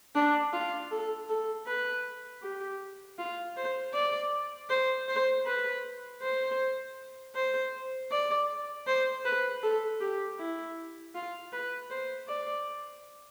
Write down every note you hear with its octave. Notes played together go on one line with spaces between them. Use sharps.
D4
F4
A4
A4
B4
G4
F4
C5
D5
C5
C5
B4
C5
C5
D5
C5
B4
A4
G4
E4
F4
B4
C5
D5